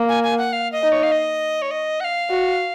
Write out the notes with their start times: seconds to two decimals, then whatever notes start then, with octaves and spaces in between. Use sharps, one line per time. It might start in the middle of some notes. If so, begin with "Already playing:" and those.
Already playing: A#3
0.09 G#5
0.23 G#5
0.38 F#5
0.53 F5
0.72 D#5
0.82 D#4
0.92 C#5
1.03 F5
1.11 D#5
1.62 C#5
1.71 D#5
2.00 F#5
2.04 F5
2.30 F#4